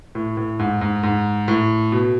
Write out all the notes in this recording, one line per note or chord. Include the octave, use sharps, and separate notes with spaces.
A2
A2
G#2
G#2
G#2
A2
B2